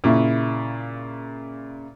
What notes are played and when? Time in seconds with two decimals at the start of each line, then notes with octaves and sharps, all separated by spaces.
0.04 A#2 C#3 E4